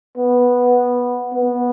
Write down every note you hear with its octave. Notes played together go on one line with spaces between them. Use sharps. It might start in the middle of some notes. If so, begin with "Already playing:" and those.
B3
B3